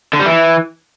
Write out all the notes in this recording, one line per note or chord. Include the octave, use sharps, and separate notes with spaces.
D3
G3
E3